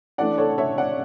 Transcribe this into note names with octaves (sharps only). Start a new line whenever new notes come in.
E3 A3 D4 D5 F#5
A4 C#5
C#5 E5
D5 F#5